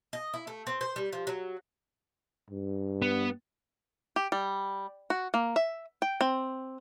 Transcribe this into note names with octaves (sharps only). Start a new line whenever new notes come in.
D#5
E4
A3
C4
C5
G3
F3
F#3
G2
B3
G4
G3
F#4
A#3
E5
G5
C4